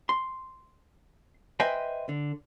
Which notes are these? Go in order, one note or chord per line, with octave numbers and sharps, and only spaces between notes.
C6
B4 C5 D#5 E5 G5 G#5
D3